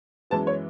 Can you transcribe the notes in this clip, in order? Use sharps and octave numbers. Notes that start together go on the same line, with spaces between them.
F#2 E3 G#3 B3 A5
C#5